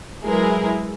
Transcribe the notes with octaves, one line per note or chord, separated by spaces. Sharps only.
F#3 G#3 E4 G#4 A#4 B4